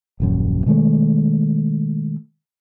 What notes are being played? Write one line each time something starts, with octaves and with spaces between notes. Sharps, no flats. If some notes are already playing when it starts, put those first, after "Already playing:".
D#1 A#1 F#2
B2 D#3 G#3 A3